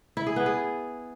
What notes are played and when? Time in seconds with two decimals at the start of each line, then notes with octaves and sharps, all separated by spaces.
0.17 E4
0.27 G#4
0.36 B3
0.46 G#4